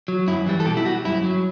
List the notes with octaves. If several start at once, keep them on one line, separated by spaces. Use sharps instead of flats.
F#3
F#2 E4
E3 G3
A4
B2 G4
E4
G3 F#4
F#2 E4
F#3